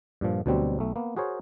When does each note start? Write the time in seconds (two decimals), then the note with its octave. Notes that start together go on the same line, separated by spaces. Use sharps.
0.21 G2 A#2 F3
0.46 D2 B2 F#3 G3 C4
0.79 B1 A3
0.96 A#3 B3
1.17 F#4 G#4 A#4 C5 C#5